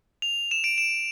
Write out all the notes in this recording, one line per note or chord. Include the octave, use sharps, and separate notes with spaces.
F7
E7
D7
E7